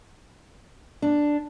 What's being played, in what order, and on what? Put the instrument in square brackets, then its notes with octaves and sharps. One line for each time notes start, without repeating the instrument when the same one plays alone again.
[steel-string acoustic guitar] D4